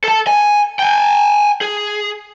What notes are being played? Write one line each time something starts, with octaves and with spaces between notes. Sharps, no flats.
A4 A5
G#5
G5 G#5
G#4